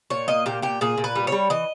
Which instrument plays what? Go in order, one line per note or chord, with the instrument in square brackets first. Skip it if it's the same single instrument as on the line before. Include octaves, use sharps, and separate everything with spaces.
[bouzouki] A#2 C#5
A#3 D#5
A#2 G4
A#2 G4
A#2 G#4
A#2
B4
G3
G3 C#5
E3 D#5